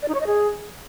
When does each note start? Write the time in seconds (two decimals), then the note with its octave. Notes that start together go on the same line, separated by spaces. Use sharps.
0.02 D5
0.08 D#4
0.14 C#5
0.20 D#5
0.27 G#4